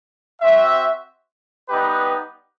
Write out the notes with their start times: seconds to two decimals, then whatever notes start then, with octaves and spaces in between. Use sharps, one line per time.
0.41 C4 F#4 E5
1.69 G3 B3 D#4 G4 B4